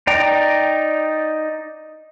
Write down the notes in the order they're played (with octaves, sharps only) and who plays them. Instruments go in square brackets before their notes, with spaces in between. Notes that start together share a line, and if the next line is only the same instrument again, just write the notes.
[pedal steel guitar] D#4 D5 G5 A#5